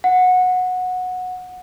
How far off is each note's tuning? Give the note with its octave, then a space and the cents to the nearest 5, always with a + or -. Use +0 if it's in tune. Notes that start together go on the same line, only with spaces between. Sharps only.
F#5 -15